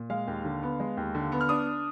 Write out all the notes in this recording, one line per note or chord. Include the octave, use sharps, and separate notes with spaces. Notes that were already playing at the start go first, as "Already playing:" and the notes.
Already playing: A#2
G#3 F5
D#2
D3
B3
G#3
D#2
D3
B3
F6
D4 D#6